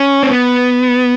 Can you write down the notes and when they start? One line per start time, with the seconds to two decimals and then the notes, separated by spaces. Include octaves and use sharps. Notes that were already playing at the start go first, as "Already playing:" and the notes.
Already playing: C#4
0.23 C4
0.30 B3